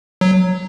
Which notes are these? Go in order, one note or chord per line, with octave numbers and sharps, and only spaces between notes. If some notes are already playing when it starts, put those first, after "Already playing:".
F#3